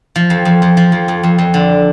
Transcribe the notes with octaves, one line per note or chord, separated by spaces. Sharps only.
F3
F2
F2
F2
F3
F2
F2
F2
F2
D3